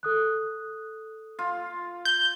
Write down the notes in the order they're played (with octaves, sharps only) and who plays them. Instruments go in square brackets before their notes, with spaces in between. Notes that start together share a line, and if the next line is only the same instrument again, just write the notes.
[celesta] A4 D#6 F#6
[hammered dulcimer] F4
[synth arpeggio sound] G6